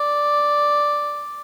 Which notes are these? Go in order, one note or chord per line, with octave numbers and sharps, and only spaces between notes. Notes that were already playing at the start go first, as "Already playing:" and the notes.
Already playing: D5